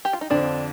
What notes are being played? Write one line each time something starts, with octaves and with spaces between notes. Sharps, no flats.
G4
F4
D#4
F2 D3 F3 C4 D4